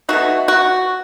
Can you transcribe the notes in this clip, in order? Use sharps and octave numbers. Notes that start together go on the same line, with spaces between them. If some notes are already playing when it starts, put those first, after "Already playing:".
B2 A3 D#4 F#4
F#4